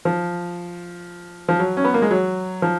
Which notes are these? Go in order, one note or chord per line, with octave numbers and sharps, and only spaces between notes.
F3
F3
F#3
C#4
B3
A#3
G#3
F#3
F3